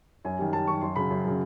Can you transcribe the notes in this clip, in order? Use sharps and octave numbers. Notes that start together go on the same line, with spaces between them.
F#2 G#5
D#3 G3
F#2 A5
D#3 G3 C#6
F#2 C6
C#3 F#3 B5
F#2
C#3 F#3